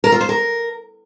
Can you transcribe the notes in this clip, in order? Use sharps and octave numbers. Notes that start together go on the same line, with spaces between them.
A#4
F4
C5
A#4